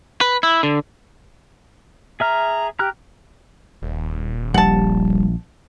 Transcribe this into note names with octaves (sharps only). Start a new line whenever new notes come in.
B4
E4
D3
G#4 E5 A#5 F6
G4 A#5 F6 F#6
D#1
A#1 G3 F#5 A5